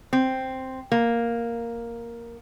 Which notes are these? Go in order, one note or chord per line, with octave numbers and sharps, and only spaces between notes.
C4
A#3